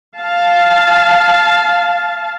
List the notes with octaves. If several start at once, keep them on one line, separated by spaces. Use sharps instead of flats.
F5 A5